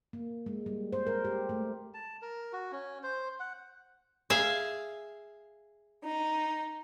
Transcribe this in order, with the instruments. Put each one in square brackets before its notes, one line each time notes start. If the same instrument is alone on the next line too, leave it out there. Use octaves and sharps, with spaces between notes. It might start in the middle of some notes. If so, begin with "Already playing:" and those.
[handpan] A#3
G#3
G3
C5
A#4
G4
A3
[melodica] A5
A#4
F#4
C#4
C5
F#5
[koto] G#4 E5 F5
[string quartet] D#4